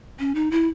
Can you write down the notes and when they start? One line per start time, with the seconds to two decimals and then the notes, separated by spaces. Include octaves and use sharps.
0.19 C#4
0.35 D#4
0.51 E4